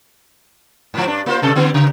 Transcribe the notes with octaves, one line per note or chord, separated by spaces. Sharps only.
G#2 F3
G2 D4
A#3 F4 C5
G2 C3 A4
D3 G3 B3
C#3